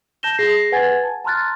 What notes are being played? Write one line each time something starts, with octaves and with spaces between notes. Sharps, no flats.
A5 G6 A#6 E7 G7
G#4 A#6 C7
B4 F#5 G#5 G#6 A6
A5
A5 A#5 C6 F6 F#6 A6